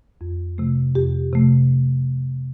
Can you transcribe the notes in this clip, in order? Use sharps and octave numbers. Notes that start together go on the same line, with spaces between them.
F2
C3 F3 A3
F2 G4
C3 F3 A3